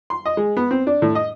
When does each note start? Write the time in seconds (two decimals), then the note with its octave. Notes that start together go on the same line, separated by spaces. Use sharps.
0.10 C6
0.26 D#5
0.37 G#3
0.57 B3
0.71 C4
0.87 D4
1.02 A2
1.15 D#5